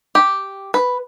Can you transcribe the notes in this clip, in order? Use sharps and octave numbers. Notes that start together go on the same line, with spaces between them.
G4
B4